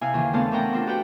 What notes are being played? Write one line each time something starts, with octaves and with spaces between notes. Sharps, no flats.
C3 E4 F5 G#5
D#2 C#3 E3
A3 B3 C4 D4 F5 A5
C#4 D4 A#4 F#5 G5 A#5
C4 D4 F4 A4
F#4 G4 B4 F#5 G5